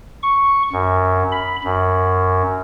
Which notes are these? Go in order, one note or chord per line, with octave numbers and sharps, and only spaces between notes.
C#6
F#2
B5
F#2